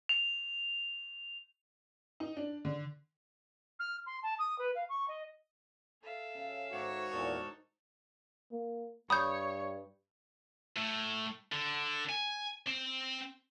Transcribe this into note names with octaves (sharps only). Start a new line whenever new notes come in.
F7
D#4
D4
D3
F6
C6
A5
D#6
B4
F5
C#6
D#5
A4 E5 F5
C#3
G#2 D#3 F#4 C#5 D5
E2 A#2 D#4 A4 A#4
A#3
G2 C#5 B5 D#6 G6
A2
D3
G#5
C4